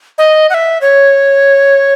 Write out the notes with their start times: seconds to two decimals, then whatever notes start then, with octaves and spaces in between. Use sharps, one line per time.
0.18 D#5
0.50 F#5
0.54 E5
0.81 C#5